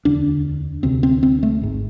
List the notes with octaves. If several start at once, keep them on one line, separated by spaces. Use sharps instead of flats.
E1 D2 D3 D4
D2 C3 C4
C4
C4
A3
G#1 G#2